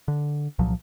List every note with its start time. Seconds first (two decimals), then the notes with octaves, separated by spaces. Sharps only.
0.08 D3
0.59 C2 A#2 F3 F#3